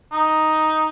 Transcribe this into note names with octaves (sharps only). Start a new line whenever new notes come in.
D#4